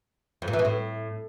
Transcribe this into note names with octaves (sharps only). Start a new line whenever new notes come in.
F2
A#2
E3
B2
A2